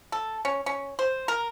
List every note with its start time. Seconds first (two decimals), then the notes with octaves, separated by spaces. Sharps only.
0.12 A4
0.45 C#4
0.66 C#4
0.99 C5
1.28 A#4